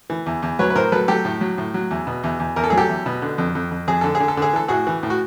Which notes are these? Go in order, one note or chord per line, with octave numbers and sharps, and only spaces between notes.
E3
E2
E2
F#3 B4 C#5
B4
A2 A#4 C5
F#3 A4 B4
F#3 G4 A4
A2
F#3
A2
F#3
E2
B2
E2
E2
E2 A#4
A4
F#3 G#4
G4 A4
E2
B2
D3
F2
F2
F2
F2 G#4
D3 A4
G#4
D3
A4
D3 G#4
E3 A4
A2 F#4 G#4
E3
A2
F#4